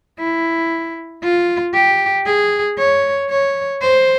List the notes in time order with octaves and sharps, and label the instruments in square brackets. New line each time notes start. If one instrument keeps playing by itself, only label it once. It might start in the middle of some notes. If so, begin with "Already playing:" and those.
[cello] E4
F4
G4
G#4
C#5
C#5
C5